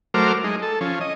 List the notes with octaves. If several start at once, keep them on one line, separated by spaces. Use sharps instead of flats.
F#3 A3 A#4 C5 D6 F6
G#3 D#4
A4
F3 C#4
D#5